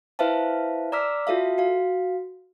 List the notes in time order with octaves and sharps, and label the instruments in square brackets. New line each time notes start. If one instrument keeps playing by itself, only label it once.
[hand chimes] E4 B4 C5 E5 F5 A5
D5 A#5 D6 E6 F6 B6
F4 F#4 A4 E5 F5
F#4 F5